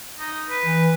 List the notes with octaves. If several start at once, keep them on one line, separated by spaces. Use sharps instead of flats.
D#4
B4
E3